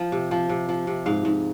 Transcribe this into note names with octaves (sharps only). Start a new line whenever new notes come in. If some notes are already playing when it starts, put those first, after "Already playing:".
Already playing: F3
C3
F3
C3
F3
C3
G#2 F5
G#2